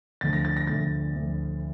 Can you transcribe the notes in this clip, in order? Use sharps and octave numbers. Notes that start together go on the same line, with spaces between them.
D2 D3 F3 A3 A6
A#6
A6
A#6
D2 D3 F3 A3 A6
D2 D3 F3 A3